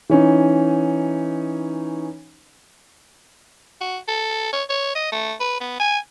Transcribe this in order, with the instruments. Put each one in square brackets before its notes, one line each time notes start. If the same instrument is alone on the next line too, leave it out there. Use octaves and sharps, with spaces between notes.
[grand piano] E3 C#4 D#4
[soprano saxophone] F#4
A4
C#5
C#5
D#5
A3
B4
B3
G#5